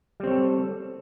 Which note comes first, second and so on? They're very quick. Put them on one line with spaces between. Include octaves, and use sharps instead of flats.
G3 C4 C#5 A4